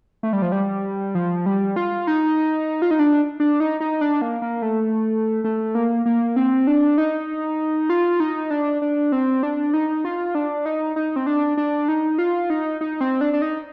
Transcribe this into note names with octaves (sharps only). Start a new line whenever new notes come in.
A3
G3
F3
G3
F3
G3
F4
D#4
F4
D#4
D4
D4
D#4
D#4
D4
A#3
A#3
A3
A3
A#3
A#3
C4
D4
D#4
F4
D#4
D4
D4
C4
D4
D#4
F4
D4
D#4
D#4
C4
D4
D4
D#4
F4
D#4
D#4
C4
D4
D4
D#4